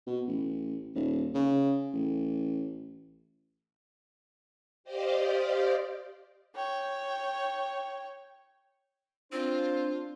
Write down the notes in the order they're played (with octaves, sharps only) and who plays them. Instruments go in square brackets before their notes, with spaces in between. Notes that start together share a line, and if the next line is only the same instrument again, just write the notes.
[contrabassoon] B2
A1
D#1
C#3
A1
[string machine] G4 C5 D5 D#5 F5
[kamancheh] C#5 G5
[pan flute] C4 [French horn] D4 [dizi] F4 [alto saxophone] C5